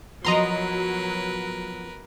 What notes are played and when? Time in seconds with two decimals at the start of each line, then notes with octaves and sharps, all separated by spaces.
0.25 F3 F#3 B3 A#4 B4 D#5 A#5 C6